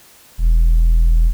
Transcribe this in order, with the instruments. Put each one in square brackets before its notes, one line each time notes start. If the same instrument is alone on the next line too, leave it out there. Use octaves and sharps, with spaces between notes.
[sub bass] E1